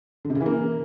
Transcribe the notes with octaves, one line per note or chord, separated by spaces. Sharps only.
D3
C3
C#3
E3
A#3